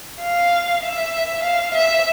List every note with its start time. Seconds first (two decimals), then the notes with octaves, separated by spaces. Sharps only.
0.21 F5
0.83 E5
1.43 F5
1.74 E5